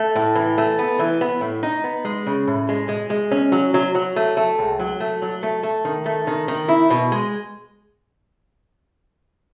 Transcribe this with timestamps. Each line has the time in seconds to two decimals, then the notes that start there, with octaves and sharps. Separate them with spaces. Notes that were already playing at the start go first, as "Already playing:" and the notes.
Already playing: A3
0.16 A2
0.35 E3
0.58 A3
0.79 B3
0.99 E3
1.21 B3
1.41 A2
1.63 D#4
1.84 B3
2.05 G#3
2.27 C#3
2.47 A2
2.69 G#3
2.89 G#3
3.10 G#3
3.32 C#4
3.52 F#3
3.74 F#3
3.95 F#3
4.16 A3
4.37 A3
4.59 C#2
4.80 F#3
5.00 A3
5.22 F#3
5.43 A3
5.63 A3
5.85 D#3
6.06 A3
6.27 D#3
6.48 D#3
6.69 E4
6.90 B2
7.12 G#3